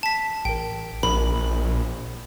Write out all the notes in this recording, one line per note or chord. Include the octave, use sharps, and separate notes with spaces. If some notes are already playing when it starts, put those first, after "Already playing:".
A5 B6
A1 A#4 G5
A#1 A#4 B5